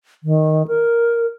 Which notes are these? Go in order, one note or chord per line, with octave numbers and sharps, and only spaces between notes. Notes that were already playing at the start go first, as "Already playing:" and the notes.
D#3
A#4